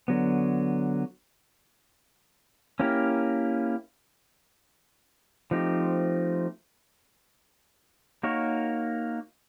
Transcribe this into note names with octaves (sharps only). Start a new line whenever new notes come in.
D3 F#3 B3
A#3 C#4 E4 G4 A#4
F3 A3 C4 D#4 G4
A#3 D#4 F#4 A#4 C#5